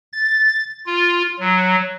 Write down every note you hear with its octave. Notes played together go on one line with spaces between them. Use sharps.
A6
F4
F#3